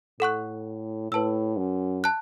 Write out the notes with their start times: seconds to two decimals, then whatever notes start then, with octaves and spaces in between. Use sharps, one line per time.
0.20 A2 A4 F#5 C#6 F#6
1.12 A2 B4 A5 E6
1.57 F#2
2.04 A5 F#6